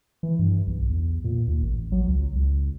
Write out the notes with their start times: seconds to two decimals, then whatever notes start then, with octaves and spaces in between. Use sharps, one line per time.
0.23 E3
0.39 G2
0.67 B1
0.89 E2
1.24 A#2
1.47 D#2
1.63 A1
1.92 F#3
2.07 C#2
2.35 C#2